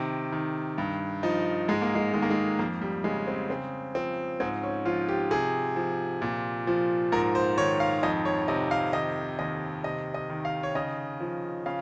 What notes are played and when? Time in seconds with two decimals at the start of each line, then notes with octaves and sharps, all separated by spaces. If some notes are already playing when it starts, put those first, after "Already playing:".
Already playing: C3 D#3
0.32 D#3
0.78 G2
1.23 F3 D#4
1.68 G#2 G#3
1.82 A#3
1.95 G#3
2.14 D#3 G#3
2.22 A#3
2.30 G#3
2.59 F2 A#3
2.82 G3
3.04 C#3 G#3
3.27 C4
3.50 C#3 C4
3.95 F3 C4
4.40 G#2 C4
4.63 C#4
4.85 F3 F4
5.08 G4
5.31 C3 G#4
5.76 F3
6.22 A#2
6.67 F3
7.12 G#2 A#4
7.35 C5
7.58 D#3 C#5
7.80 F5
8.03 F2 D#5
8.25 C#5
8.48 C3 D#5
8.71 F5
8.93 D#3 D#5
9.39 D#2 D#5
9.84 C3 D#5
10.14 D#5
10.30 D#3
10.45 F5
10.63 C#5
10.75 C#3 D#5
11.20 F3
11.66 C#3 F5